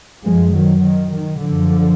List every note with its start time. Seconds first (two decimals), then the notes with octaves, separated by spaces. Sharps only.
0.25 F#2 F3 G#3
0.54 D#3 F#3
0.84 D#3
1.14 D#3
1.42 F#2 D3 F3